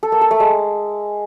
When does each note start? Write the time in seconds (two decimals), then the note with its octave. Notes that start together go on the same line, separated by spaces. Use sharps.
0.03 A4
0.12 A#3
0.21 A4
0.31 A3
0.40 G#3